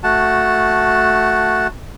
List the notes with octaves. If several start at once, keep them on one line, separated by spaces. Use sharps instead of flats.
A3 F#4 F#5 A5